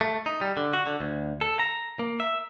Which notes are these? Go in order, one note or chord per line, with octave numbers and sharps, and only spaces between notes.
A3
D#4
G3
D3
F#4
D3
D2
A4
A#5
A#3
E5